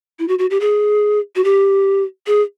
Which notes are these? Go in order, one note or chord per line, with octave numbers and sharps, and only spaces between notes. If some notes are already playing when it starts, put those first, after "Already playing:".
E4
F#4
F#4
G4
G#4
F#4
G4
G#4